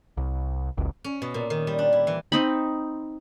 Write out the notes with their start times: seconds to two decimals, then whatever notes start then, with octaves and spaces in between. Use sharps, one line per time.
0.17 C2
0.77 F#1 C#2
1.04 C#4
1.22 B2
1.34 A#2
1.50 D#3
1.67 G3
1.79 D4
1.93 E4
2.07 E3
2.32 C4 D#4 B5